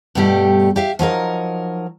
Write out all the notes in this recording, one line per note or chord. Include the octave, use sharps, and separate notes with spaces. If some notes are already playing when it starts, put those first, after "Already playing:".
G2 B2 G3 A3 G4
G4 E5 F5
F3 F#3 D#4 A#4